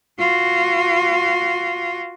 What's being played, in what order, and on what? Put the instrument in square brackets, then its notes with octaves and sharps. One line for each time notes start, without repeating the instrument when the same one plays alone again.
[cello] F4 F#4